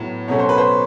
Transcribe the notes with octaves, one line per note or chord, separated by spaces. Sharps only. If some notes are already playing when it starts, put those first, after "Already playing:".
Already playing: A2 F#3 B3
B2 F#3 A3 C#4 C#5
C5
B4
C5